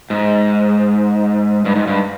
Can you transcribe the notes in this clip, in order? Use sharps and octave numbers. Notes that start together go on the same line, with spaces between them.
G#2
G2
G#2
G2